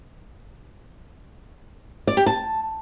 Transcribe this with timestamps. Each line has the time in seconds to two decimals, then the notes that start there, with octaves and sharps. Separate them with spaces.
2.07 D5
2.17 G4
2.26 A5